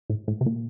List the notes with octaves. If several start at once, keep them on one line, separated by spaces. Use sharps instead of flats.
A2
A2
C3
A#2